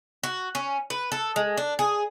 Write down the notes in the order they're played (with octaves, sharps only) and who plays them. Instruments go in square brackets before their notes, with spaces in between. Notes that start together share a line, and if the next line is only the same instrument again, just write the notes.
[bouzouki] F#4
C#4
B4
A4
G#3
D4
G#4